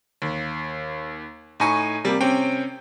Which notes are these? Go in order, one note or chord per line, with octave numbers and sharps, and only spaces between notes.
D#2
A2 D#4 G#5 C#6
C3 G3 A#3
C3 C4 C#4 G5